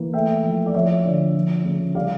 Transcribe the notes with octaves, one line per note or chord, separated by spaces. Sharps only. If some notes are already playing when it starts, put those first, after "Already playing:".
Already playing: E3 A#3
A3 E5 G5
F3
D5
F3 C#5 E5
D3
F3
C#3
G3 D5 F5